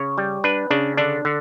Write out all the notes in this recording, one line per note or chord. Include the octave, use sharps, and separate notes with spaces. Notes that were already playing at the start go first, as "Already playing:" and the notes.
Already playing: C#3 C#5
G3
D4 B4
C#3 D4
D3 D4
D3